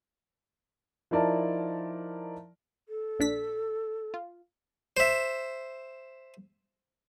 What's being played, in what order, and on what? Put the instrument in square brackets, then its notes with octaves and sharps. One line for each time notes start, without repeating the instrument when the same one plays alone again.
[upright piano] F3 D#4 E4 A#4 D5 A5
[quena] A4
[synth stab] A#1 D4 B6
F4
[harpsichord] C5 E5